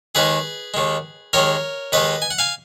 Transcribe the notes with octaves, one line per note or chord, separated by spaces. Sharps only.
D#2 D#3 G#3 G#4 B4
D#2 D#3 G#3
D#2 D#3 G#3 A#4 C#5
D#2 D#3 G#3 B4 D#5
G#5
F#5
F5 G#5